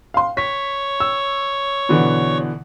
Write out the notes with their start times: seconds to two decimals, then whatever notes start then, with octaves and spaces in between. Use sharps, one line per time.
0.14 F5 C6
0.37 C#5 B6
1.00 E6
1.89 B2 D3 E3